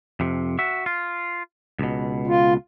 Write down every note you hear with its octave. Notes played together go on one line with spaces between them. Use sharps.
F2 C3
F#4 E5
F4
C#2 B2
F4